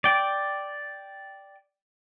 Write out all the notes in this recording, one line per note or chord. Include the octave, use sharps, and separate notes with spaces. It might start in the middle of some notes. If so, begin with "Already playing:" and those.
D5 G5